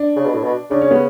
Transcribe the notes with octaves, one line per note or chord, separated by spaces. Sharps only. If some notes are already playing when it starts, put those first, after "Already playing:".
Already playing: D4
C#3
B2
A2
B2
C#3 D4
C#4
B3